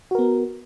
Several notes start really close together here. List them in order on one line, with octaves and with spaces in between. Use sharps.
F#4 A#4 B3